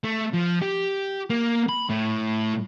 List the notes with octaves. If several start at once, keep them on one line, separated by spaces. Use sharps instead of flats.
A3
F3
G4
A#3
B5
A2